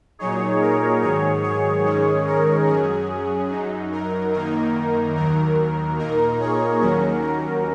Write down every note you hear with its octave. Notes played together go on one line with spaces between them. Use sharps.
A#2 F#3 D#4 G#4 C#5
A#4
G#2 D#3 F#3 G#4 C#5
G#4 C#5
G#2 D#3 G#3 C#4 G#4 C#5
A#4
F#2 F#3 C#4 G#4
F#2 F#3 D#4
A#4
F#2 D#3 A#3 D#4 A#4
D#2 D#3 F#3 A#4
A#2 A#3 D#4 A#4
G#4 C#5
D#2 D#3 F#3 C#4 A#4
A#4